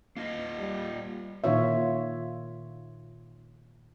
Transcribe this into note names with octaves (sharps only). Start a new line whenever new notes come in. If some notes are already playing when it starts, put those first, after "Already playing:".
A#3 F4 D#5
G3
A#2 D#3 F4 C#5 E5